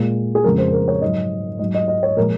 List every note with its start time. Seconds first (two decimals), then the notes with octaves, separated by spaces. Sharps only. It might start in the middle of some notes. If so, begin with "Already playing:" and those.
Already playing: A#2 G#3
0.35 G#4
0.44 F2 C#3 F3 G#3 A#4
0.58 C5
0.73 A#4
0.88 C#5
1.01 G#2 F#3 D#5
1.59 G#2 F#3 D#5
1.74 D#5
1.88 D#5
2.03 C#5
2.16 A#2 F3 G#3 A#4